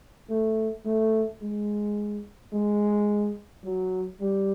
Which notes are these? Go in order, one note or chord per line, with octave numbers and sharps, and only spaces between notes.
A3
A3
G#3
G#3
F#3
G3